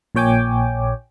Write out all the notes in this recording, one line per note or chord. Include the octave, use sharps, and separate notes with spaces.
A#1 A#2 C#5 G5 G#5 D6